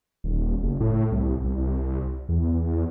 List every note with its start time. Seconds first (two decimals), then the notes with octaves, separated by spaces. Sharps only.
0.24 D#1
0.63 F#1
0.80 A2
1.12 C2
1.44 C2
2.29 E2